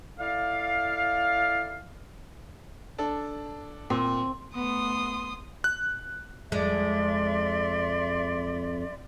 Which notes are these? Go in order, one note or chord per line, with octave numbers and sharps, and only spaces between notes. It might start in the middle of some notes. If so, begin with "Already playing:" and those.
E4 A4 D5 F5
D4 A4
A#2 C4
A3 B3 C6 D#6
F#6
F2 G#3 D5 E5 C6